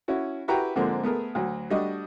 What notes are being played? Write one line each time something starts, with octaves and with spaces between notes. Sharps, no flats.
C#4 E4 F#4
E4 F#4 G4 B4 G5 A#5
G#2 D3 F3 A#3 C4
A3 B3 G#4 A#4
D2 F#3
G3 A3 D4 F#4 D#5